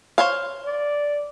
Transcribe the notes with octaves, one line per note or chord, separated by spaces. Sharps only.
C5 C#5 F5
D5